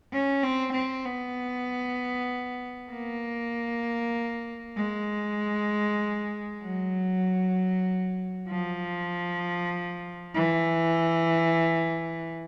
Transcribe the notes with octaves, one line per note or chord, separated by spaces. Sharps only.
C#4
C4
C4
B3
A#3
G#3
F#3
F3
E3